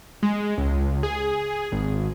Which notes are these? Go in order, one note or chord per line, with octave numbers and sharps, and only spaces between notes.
G#3
C#2
G#4
G#1